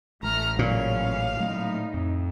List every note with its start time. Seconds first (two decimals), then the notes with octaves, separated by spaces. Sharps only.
0.23 A1 A3 A#5 F6
0.59 A#2 C#3 F#3 C#4 F5
1.40 A2 F#3 A3 A#3 D#4
1.94 F2